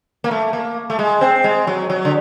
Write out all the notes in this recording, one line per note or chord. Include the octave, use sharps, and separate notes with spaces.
A#3
A3
A#3
A3
G#3
C4
G#3
F#3
F#3
D3